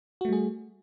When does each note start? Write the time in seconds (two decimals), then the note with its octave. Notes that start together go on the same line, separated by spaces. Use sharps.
0.21 F#4
0.25 A3
0.29 G3
0.33 G#4